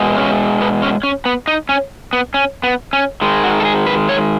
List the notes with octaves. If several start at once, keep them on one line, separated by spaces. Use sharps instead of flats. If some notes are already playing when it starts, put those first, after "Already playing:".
Already playing: B2 G#3
C#4
B3
C#4
C#4
B3
D#4
C#4
B3
C#4
B3
C#4
D#3 G#3
F#4
A4
G#4
B4
C#5